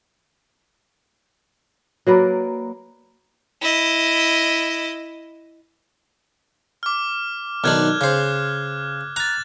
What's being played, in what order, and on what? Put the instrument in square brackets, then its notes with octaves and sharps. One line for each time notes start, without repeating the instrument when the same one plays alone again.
[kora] F#3 A#3 B4 D5
[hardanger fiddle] E4 D#5
[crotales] D6 F6
[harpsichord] B1 D#3 D4 [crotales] F6 F#6 G#6
[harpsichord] C#3 C5 [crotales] D6
[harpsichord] A#5 [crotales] F#6 A6